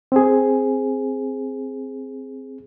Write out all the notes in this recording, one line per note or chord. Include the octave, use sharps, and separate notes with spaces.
C4 G#4